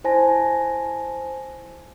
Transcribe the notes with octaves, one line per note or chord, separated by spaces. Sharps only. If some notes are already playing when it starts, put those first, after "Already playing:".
E4 C5 G#5 A5 A#6